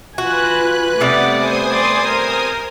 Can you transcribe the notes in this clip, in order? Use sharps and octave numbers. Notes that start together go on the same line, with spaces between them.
F4 F#4 B4 G#5 F#6
C3 G3 A3 B3 D5 F#5
C5 G#5 D#6
D5 C6
A#4